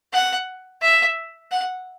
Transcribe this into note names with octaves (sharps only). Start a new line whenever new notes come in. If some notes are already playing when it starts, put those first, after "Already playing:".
F#5
E5
F#5